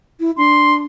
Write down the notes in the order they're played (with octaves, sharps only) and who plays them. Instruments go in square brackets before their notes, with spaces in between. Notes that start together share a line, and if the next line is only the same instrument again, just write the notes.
[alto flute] E4
[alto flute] D4 [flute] C6